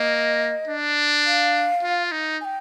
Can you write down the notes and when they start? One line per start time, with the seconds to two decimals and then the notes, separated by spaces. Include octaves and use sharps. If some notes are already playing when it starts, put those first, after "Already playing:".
Already playing: A#3 D#5
0.67 D4
1.25 F5
1.83 F4
2.11 D#4
2.41 G#5
2.45 G5